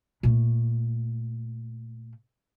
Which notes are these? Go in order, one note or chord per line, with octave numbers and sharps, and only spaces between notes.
A#2 A3